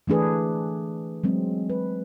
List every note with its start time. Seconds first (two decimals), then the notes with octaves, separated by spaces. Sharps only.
0.07 E3 A3 D4 G#4 B4
1.24 F#3 G#3 C4
1.70 B4